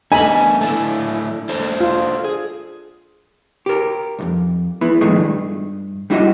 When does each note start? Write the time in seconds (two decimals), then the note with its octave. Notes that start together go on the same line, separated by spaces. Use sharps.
0.12 A3 B3 D4 A4 D#5 G#5 B5
0.61 A3 D4 E4 A5
1.49 D4 A4 C5
1.81 F4
2.24 G#4
3.66 G4 A#4
4.19 B1 F2
4.81 B3 E4 B4
5.01 A2 D#3 F3 G#3 A3
5.16 G2
6.10 G3 D4 E4 F#4 D#5